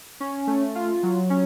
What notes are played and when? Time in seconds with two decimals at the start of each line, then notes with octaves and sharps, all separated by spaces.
0.20 C#4
0.47 A3
0.75 F4
1.03 F#3
1.30 C#4